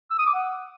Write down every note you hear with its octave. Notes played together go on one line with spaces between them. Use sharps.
E6
D#6
D6
F#5